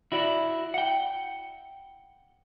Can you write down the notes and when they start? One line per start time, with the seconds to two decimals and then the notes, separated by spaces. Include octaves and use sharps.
0.12 E4 F#4 D5
0.74 F#5 G5